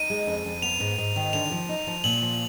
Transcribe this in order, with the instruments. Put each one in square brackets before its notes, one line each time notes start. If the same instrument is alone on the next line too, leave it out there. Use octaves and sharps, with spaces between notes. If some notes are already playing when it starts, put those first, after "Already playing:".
Already playing: [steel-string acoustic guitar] D#4 [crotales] D#7
[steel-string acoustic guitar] G#3
F2
F2
[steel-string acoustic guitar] B3 [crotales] F7
[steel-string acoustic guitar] G#2
G#2
D#3
[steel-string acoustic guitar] D3 [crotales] F7
[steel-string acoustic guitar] F3
D#4
F3
[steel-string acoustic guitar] A#2 [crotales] F#7
[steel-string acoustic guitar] F3